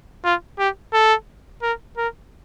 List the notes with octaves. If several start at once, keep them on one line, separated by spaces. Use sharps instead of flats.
F4
G4
A4
A#4
A#4